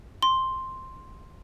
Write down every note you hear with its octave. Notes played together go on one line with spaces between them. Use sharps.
C6